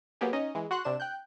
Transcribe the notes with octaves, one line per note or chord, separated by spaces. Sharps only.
F#3 A#3 B3 G4 G#4
C#4 D#4 D#5
E3 G#3
F#4 F#5 C6 F#6
C3 D4 E7
G5 F#6 G6